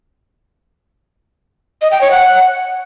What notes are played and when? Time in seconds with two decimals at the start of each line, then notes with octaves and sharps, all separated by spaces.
1.82 D#5
1.91 G5
2.01 C#5
2.11 F#5